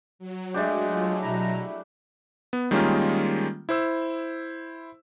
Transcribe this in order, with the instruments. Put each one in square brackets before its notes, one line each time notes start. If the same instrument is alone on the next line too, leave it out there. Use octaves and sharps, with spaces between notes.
[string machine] F#3
[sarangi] G#3 [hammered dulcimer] A3 D4 G4
[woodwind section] F4
[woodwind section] B2 A#5 [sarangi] E4
[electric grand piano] B3
D#3 G3 G#3 A#3 C#4 F4
E4 C5 E6